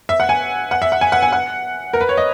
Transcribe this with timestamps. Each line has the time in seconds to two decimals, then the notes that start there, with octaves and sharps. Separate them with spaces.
0.09 E5
0.20 F#5
0.29 G#5
0.71 F#5
0.82 E5
0.92 F#5
1.01 G#5
1.12 F#5
1.22 G#5
1.33 F#5
1.93 A#4
2.01 B4
2.09 C#5
2.17 D#5